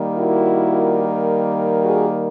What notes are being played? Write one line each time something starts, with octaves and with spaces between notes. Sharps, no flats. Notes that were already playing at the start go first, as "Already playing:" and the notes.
Already playing: D#3 G3 A#3
E4 F#4
F#4 G#4